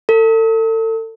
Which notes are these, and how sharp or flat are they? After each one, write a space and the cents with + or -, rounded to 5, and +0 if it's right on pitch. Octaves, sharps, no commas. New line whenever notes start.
A4 +35